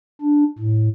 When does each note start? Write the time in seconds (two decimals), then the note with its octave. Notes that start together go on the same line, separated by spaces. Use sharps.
0.22 D4
0.58 A2